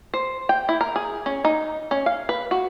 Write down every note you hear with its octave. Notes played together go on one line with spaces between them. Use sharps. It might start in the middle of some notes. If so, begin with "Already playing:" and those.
C5
G5
E4
A#4
G#4
C#4
D#4
C#4
F5
B4
F#4